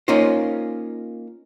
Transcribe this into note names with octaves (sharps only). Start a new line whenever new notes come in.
A#3 C#4 D#4 F4 C5